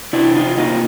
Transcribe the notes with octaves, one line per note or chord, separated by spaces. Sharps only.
C3 D4 E4
D#4 F4
A#3 D#4 F4